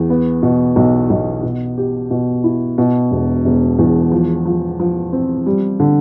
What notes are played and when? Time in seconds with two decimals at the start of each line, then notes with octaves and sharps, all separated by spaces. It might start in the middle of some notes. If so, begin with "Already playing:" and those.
Already playing: E2
0.10 B3
0.42 B2
0.76 B1
1.10 B1
1.43 B2
1.78 G4
2.11 B2
2.44 E4
2.78 B2
3.11 E1
3.45 E1
3.79 E2
4.12 F3
4.45 F3
4.80 F3
5.12 C4
5.46 G3
5.80 D3